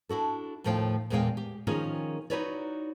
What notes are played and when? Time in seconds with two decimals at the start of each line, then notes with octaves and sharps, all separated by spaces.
0.09 D4 E4 F#4 A4
0.64 D#2 A2 F3 A3 F5 G5
1.10 E2 A#2 G#3 D5 F5 G5
1.37 G4
1.67 D#3 F3 C#4 F4 G#4 A#4
2.30 D#4 E4 F#4 B4 C#5 D5